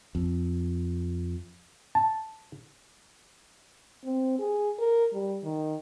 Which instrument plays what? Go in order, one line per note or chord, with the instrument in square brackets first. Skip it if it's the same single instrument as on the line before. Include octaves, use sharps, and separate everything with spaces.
[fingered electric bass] F2
[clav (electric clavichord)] A5
[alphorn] C4
G#4
A#4
G3
D#3